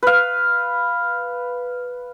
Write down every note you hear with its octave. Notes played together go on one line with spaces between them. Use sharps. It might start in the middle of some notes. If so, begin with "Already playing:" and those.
B4 F5